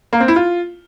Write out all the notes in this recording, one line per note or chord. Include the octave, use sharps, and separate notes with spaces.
A#3
C4
E4
F4